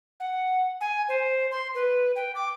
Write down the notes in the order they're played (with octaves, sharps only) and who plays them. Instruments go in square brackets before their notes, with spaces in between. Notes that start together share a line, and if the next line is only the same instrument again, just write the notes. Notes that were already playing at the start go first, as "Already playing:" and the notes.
[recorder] F#5
G#5
C5
C6
B4
G5
D6